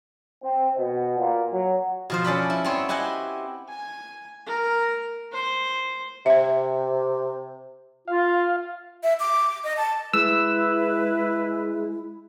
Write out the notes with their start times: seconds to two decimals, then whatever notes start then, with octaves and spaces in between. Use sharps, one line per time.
0.43 C4
0.77 B2
1.17 A#2
1.51 F#3
2.10 B2 F3 C5
2.24 C#4 A4 D5 B5
2.50 E4
2.64 B3 C4 C#5
2.89 E4 G4 D#5 F#5 G#5
3.68 G#5
4.46 A#4
5.32 C5
6.26 C3 C5 E5
8.08 F4 F5
9.03 E5
9.20 D6
9.64 D#5
9.77 A5
10.13 G#3 E4 B4 E6